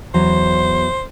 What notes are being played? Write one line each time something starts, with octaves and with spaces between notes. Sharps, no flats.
E2 F#3 C5